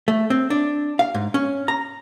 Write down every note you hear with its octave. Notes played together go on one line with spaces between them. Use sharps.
A3
C4
D4
F5
G#2
C#4
A#5